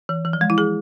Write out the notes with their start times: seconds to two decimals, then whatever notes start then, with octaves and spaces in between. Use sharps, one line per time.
0.09 E3
0.25 E3
0.33 F3
0.41 G#3
0.50 E4
0.58 G#4